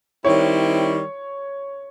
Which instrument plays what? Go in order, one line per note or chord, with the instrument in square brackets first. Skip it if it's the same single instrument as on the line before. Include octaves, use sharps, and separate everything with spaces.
[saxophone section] D#3 G3 C4 E4 [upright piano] C#5